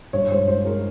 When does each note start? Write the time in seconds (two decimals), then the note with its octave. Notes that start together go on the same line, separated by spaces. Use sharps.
0.13 G2 C#5
0.30 G#3 C5
0.48 G#3 C5
0.65 G#3 A#4